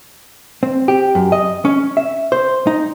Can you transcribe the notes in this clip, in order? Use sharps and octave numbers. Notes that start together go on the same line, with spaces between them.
C4
G4
F#2
D#5
C#4
E5
C5
D#4